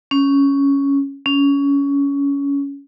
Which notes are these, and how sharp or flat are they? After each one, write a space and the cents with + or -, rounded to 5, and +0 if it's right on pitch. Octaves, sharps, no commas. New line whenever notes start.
C#4 +5
C#4 +20